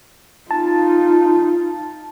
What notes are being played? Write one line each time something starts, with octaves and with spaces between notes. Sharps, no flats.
D#4 F4 A5